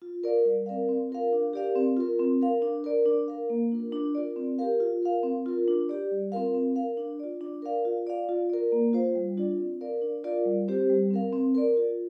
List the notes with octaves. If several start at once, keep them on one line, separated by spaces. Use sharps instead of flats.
F4
A#4 D5 F5
G3
C4 A#4 D5 F5
C4
F4 A#4 F5
D4
G4 A#4 D5 F5
C4
F4 A#4
C4
A#4 F5
D4
A#4 D5
D4
A#4 F5
A#3
D4 F4 A#4
D4
F4 A#4 D5
C4
G4 A#4 F5
F4
A#4 F5
C4
F4 A#4
D4
G4 D5
G3
C4 F4 A#4 F5
C4
A#4 F5
D4
F4 D5
D4
A#4 D5 F5
F4
D5 F5
F4
A#4 D5
A#3
F4 C5 F5
G3
D4 F4 D5
C4
A#4 D5 F5
D4
F4 A#4 D5 F5
G3
C4 G4 C5
G3
C4 A#4 F5
C4
A#4 D5
F4